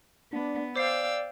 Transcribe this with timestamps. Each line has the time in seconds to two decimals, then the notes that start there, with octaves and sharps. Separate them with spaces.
0.33 B3 D4
0.76 C5 D5 F5 G5 E6 C7